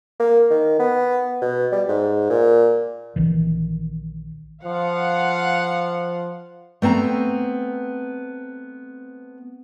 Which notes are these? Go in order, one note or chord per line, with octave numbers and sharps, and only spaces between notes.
A#3
D#3
B3
B2
G3
G#2
A#2
A#1 D#3 E3
F3 F5 F#5
A3 B3 C4 A#5